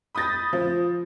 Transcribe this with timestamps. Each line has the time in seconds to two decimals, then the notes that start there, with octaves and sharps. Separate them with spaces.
0.15 B5 D#6 G6 A6 A#6
0.53 F3